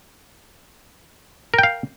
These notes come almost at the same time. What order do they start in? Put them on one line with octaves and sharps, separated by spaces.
A#4 G5 F5